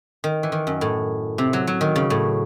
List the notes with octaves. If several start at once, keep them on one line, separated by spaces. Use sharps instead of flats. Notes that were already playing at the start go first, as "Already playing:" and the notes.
D#3
E3
D#3
F#2
A2
C3
F#3
F#3
D#3
C#3
A2